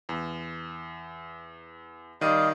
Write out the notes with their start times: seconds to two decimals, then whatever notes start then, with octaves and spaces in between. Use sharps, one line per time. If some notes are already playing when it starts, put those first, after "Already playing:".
0.09 E2
2.21 D#3 G3 D5 D#5 F5 D#7